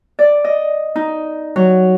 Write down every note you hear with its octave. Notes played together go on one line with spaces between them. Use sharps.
D5
D#5
D#4
F#3